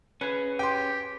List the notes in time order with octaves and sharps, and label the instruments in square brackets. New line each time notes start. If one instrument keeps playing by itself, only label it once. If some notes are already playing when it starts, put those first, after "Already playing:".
[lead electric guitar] C#4 G#4 [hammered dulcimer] B4
[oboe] G4 [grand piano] G5 C6